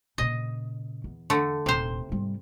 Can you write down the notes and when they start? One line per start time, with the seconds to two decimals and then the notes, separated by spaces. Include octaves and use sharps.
0.18 A#2 C#3 D#5
1.04 E2
1.30 D3 A3
1.66 D#1 C3 C5
2.09 G#2 G3